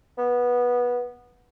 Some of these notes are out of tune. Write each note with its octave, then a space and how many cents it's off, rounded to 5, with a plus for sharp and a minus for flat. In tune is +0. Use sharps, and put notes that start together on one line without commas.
B3 -15